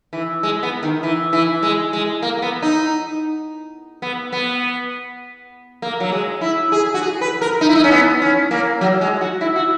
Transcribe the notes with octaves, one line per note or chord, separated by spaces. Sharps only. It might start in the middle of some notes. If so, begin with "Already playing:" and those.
E3
G#3
B3
D#3
E3
E3
G#3
G#3
A#3
B3
D#4
B3
B3
A#3
F#3
G#3
E4
G#4
F#4
G#4
B4
A#4
D#4
E4
D#4
C#4
B3
C#4
A#3
F#3
G#3
F#4
E4
F#4